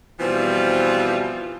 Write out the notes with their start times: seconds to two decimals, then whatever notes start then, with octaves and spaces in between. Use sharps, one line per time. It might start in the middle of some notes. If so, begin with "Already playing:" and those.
0.20 B2 E3 F3 G3 C4 F4